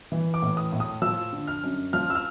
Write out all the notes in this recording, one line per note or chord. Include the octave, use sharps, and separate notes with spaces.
E3
D6
A2
D#6
A2
D#6
F3 E6
D3
F6
F#2
F3 F6
E6
F6